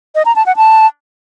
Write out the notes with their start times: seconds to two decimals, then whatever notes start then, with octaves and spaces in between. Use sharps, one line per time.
0.15 D#5
0.25 A#5
0.36 A5
0.46 F#5
0.57 A5